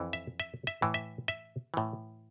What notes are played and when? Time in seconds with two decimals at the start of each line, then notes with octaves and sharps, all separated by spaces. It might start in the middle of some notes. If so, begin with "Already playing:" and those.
Already playing: F2 E3
0.13 E5
0.40 E5
0.67 E5
0.82 A2 E3
0.94 E5
1.28 E5
1.74 A2 E3